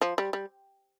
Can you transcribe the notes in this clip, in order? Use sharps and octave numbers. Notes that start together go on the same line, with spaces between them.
F3
G3
G3